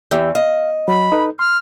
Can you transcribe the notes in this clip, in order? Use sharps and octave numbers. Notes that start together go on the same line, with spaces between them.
E2 E3 G4 E5 G6
D#5 F5
F#3 B5
D#4 A4 B4
C6 F6